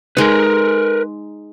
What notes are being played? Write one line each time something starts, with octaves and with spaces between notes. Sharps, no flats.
G#3 D#4 A#4 B4